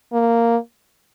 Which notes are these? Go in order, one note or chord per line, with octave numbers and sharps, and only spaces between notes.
A#3